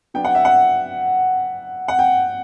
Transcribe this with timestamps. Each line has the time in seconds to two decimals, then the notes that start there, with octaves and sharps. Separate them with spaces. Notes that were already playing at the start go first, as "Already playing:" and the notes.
0.14 F#3 B3 D4 G5
0.25 F#5
0.35 E5
0.45 F#5
1.88 F#5
1.99 G5